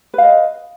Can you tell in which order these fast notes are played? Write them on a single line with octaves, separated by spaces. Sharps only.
B4 F5 D#5